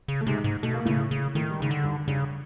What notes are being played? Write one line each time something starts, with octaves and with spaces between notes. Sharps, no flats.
C#3
A3
G#2 C3 G#3
G#2
B2 A3
A#3
A2 C#3 A3
C#3
A2 D#3 A3
G3
G#2 C#3 G#3
D3
G2 G3
G2 C#3 G3